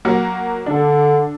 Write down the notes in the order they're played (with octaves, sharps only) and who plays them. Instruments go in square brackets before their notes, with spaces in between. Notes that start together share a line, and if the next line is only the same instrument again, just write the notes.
[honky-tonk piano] F#3 A#3 F#4
[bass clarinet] D3 [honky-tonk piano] D4 A4